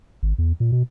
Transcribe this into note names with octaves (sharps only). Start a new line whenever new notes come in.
G#1
E2
A#2
B2